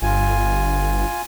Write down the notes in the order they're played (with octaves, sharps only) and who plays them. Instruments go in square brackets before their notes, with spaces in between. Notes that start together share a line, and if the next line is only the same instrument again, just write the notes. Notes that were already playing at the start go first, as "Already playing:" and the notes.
[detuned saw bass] G1 [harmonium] F4 G#5